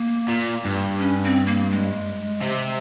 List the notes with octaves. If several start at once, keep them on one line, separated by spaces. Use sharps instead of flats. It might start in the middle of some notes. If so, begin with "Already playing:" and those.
Already playing: A#3
A#2
G2
C#4
C4
A#3
G#3
C3